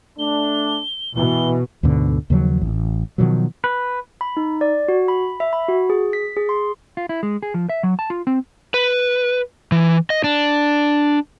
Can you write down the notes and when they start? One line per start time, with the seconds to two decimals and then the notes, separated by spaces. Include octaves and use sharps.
0.19 A3 D4 G7
1.15 B2 E3 G7
1.83 D2 G#2 B2 D3
2.30 D#2 C#3 F3 F#3
2.61 A1
3.18 B2 D#3 F3 F#3
3.64 B4
4.21 B5
4.37 D#4
4.61 D5
4.88 F#4
5.08 B5
5.40 E5
5.53 B5
5.68 F#4
5.90 G#4
6.13 B6
6.36 G#4
6.49 C6
6.97 F4
7.09 E4
7.23 G#3
7.43 G#4
7.54 F3
7.69 E5
7.83 F#3
7.99 A5
8.10 F4
8.27 C4
8.74 B4
9.72 E3
10.10 D#5
10.24 D4